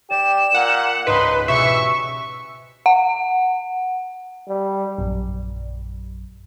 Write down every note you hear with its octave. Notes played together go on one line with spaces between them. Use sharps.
G4 D5 E7
A#2 F#5
C#2 G#2 D#4 B4 C6
B2 E3 G4 G#4 E5 C#6
F#5
G3
A#1 F#2